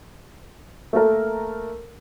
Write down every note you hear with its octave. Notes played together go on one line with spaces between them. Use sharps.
A3 A#3 A4 A#4